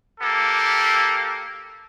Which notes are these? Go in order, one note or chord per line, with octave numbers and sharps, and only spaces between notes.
A#3 G4 A4